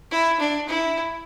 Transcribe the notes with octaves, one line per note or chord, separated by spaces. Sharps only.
E4
D4
E4